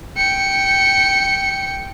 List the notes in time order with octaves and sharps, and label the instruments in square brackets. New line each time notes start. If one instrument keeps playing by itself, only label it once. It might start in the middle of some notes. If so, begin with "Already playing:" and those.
[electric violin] G5 C#7